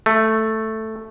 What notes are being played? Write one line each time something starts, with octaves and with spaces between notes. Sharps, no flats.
A3